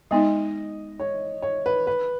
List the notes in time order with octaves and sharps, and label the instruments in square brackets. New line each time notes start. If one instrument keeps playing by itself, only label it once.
[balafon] G#3 B3 D#4 [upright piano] D#5
[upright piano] C#5
C#5
B4
B4